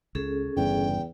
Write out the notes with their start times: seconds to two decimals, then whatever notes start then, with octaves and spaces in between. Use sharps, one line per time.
0.15 C#2 C#4 G#4 A4
0.57 G1 E2 G2 C#3 G5